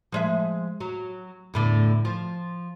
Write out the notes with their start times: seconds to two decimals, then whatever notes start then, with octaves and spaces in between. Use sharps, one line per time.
0.12 F3 G#3 E5
0.81 F#3
1.54 E2 A2 D3
2.05 F3